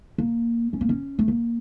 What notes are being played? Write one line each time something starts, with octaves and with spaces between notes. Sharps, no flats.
A#3
C#4
A#3
C#4
A3
A#3